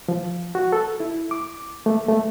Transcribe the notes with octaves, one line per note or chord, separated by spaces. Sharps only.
F3
F#4
A4
E4
D6
A3
A3